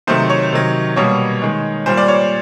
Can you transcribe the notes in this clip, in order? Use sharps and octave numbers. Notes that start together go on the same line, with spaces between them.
C3 D#3 F#3 A3 C5
C#5
C3 D#3 F#3
B2 G3 A#3 C#5
D#3 G#3
A#2 G3 A#3 C5
D5
C#5